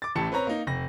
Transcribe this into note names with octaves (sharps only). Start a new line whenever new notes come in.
D6 A6
A1 A2 G4 A5 C#7
C4 B4 C#5 A#5
A#3 D#4
F1 A#6